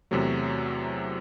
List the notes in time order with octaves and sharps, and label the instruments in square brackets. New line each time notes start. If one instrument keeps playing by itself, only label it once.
[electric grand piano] E2 C3 F#3 A3